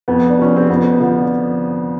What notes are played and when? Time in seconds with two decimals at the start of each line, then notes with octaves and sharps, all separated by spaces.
0.08 F2 B3
0.29 D4
0.39 C3 F3 C#4
0.56 C4
0.69 F2 B3
1.00 D3 F3